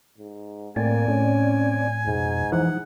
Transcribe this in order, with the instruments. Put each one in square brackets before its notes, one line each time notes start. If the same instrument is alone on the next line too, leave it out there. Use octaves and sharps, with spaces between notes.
[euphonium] G#2
[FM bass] A2 [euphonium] A#3 [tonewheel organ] C4 D5 [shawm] G#5
[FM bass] A2 [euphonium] C#4
[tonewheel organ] F2 B2 [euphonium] G#2
[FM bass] E3 [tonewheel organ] F3 D#4 [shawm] F#5